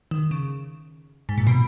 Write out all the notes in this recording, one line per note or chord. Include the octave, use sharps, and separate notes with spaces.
D#3
C#3
G#2
A#2
B2